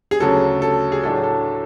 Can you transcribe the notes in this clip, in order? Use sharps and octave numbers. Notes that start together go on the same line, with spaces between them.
G#4
D2 C#3 F#3 A4
A4
G#4
A2 F#3 A3 D4 A4
A4